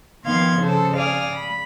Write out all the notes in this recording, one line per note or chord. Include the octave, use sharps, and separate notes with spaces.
D#3 F3 B3 F5 C6 G#6
C#3 A4 C5
D5 F5 G#5 D#6 F6
B5